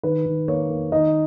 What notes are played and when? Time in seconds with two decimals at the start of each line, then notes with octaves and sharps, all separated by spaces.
0.03 D#3 B4
0.26 D#3
0.48 A#3 C#5
0.70 A#3
0.92 D#3 D#4 D#5